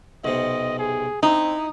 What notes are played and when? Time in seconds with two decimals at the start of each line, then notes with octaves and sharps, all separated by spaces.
0.24 B1 C3 D#5
0.79 G#4
1.23 C4 D#4 E4